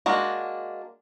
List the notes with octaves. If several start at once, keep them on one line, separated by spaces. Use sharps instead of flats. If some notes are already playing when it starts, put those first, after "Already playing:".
G#3 A#3 D4 F#4